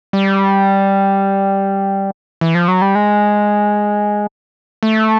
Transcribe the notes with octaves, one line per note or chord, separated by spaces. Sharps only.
G3
E3
F3
F#3
G3
G#3
A3